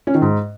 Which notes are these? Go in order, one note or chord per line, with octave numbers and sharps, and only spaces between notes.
C#4
D#3
G#2